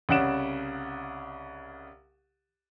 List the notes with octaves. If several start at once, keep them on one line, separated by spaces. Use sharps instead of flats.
C2 C#3 F#5 D7 E7